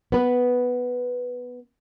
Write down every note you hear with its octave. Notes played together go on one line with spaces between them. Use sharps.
B3 B4